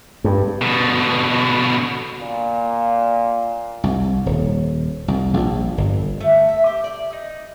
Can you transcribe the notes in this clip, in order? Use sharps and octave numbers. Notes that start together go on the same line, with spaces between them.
G2
B2 D3
A#2
C2
D#1
C2
A#1
G1
A3
E5
G4
D5
D#4